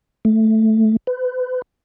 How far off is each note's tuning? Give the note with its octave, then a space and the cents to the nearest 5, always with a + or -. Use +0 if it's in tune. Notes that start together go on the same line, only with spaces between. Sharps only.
A3 +0
B4 +40